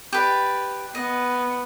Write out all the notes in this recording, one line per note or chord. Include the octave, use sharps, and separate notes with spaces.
G4 B4 D5
B3 D#5